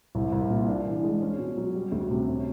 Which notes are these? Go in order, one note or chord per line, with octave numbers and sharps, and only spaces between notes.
C2
C2
A#2
D4
E3
G#3
C#4
B2
F#3
G3
D2
C3
C#4